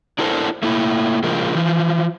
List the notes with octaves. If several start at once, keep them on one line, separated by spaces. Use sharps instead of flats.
D4 E4 A4 A#4 C5
A3 A#3 E4
C#3 F3 G#3 A#4
E3 F3